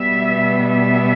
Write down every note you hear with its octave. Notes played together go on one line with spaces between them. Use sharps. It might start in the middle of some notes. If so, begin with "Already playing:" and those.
Already playing: B2 G3 B3 E5
E5